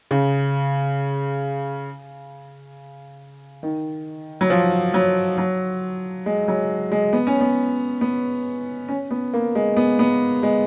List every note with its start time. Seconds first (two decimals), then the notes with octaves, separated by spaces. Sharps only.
0.11 C#3
3.63 D#3
4.41 F#3
4.50 F3
4.94 F#3
5.38 F#3
6.26 G#3
6.48 F#3
6.92 G#3
7.13 B3
7.27 C#4
7.41 B3
8.01 B3
8.89 C#4
9.11 B3
9.33 A#3
9.55 G#3
9.77 B3
9.99 B3
10.43 G#3